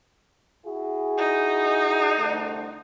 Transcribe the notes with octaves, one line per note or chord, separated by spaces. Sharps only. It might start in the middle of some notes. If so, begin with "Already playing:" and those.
E4 F#4 G#4
D#4
C2 D3 A3